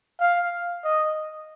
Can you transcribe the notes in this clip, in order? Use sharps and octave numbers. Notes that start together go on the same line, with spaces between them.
F5
D#5